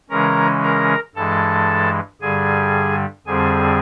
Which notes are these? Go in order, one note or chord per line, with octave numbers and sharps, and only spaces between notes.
C#3 E3 G#3 C#4 A#4 A#5
A#4 A#5
G2 E3 G#3 A4 A5
G2 D3 G3 G#4 G#5
F2 D3 G3 C4 G#4 G#5